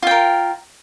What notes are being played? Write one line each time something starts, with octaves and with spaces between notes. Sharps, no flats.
F4 A#4 G5